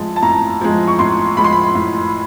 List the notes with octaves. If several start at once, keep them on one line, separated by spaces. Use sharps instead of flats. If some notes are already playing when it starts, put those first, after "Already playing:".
Already playing: A2 F3 G#3 A5
A5
A2 A#5
F3 G#3
C#6
A2 C6
F3 G#3 B5
C6
B5
A2